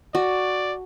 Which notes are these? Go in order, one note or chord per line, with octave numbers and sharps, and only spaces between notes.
F#4 D5 A5